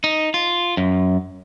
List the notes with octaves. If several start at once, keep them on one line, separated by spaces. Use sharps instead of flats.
D#4
F4
F#2